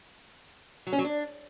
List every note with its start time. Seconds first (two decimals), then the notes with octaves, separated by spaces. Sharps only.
0.87 F#3
0.93 C#4
0.99 F#3
1.04 D4